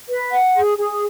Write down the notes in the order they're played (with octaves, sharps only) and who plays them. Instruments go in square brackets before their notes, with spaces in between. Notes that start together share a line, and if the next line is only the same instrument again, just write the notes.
[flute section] B4
F#5
G#4
G#4